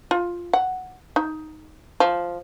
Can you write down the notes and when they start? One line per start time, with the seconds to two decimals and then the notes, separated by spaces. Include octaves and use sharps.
0.11 F4
0.53 F#5
1.16 D#4
2.00 F3